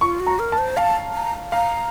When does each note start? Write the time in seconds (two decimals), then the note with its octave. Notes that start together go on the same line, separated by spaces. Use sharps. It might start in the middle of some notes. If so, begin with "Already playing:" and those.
0.01 F4 C#6
0.20 F#4
0.26 A#5
0.39 A#4
0.52 A5
0.58 C5
0.77 F5 A5
1.14 A#5
1.52 F5 A#5